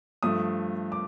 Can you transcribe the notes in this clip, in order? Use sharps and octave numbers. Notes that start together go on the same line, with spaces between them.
G2 F3 A3 D#6
D6